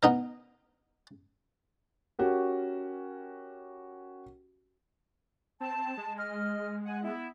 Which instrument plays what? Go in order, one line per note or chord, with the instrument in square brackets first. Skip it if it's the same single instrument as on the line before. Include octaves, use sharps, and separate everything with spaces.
[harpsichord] B3 D#4 A#4
[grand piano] C#4 F#4 G4 A#4
[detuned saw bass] C4 [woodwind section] A5
[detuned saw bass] G#3
[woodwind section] D#5 F6
F#5 G#5
B3 E4